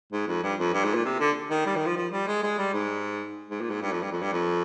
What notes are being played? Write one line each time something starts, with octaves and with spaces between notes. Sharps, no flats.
G#2
F2
G2
F2
G2
G#2
A#2
C3
D3
D#3
G3
D#3
F3
F3
G3
G#3
G#3
G3
G#2
G#2
A#2
G#2
G2
F2
G2
F2
G2
F2